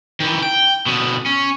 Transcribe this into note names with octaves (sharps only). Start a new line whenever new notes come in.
D#3 E3
G5
B2 D3
C#4